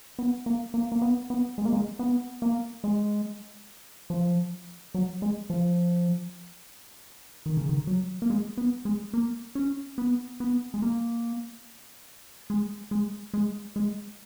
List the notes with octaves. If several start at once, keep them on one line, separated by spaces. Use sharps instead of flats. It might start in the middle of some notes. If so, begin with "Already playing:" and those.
B3
A#3
A#3
A#3
B3
B3
G#3
A#3
G#3
B3
A#3
G#3
F3
F#3
G#3
F3
D#3
C#3
D#3
F#3
A#3
G#3
B3
G#3
A#3
C#4
B3
B3
G#3
A#3
G#3
G#3
G#3
G#3